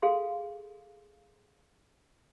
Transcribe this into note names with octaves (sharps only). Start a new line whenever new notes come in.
G#4 A4 F5 C6